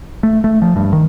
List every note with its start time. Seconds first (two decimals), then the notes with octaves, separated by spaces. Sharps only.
0.23 A3
0.44 A3
0.62 F3
0.76 G2
0.93 D#3